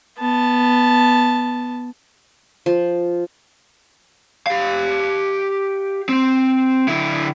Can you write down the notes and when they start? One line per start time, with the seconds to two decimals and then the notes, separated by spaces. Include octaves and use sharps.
0.19 B3 A5
2.66 F3
4.47 G4 F5
6.09 C4
6.88 D3 E4